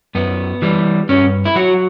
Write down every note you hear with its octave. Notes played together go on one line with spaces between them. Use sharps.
F#2 B3
E3 G3
G2 C#4
E4
F#3 F#4